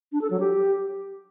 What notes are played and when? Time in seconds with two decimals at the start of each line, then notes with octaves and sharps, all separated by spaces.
0.12 D4
0.21 A4
0.31 F#3
0.40 G4